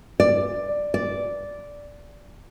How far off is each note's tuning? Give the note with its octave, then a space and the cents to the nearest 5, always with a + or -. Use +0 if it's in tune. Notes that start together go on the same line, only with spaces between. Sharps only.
D5 +10
D5 -10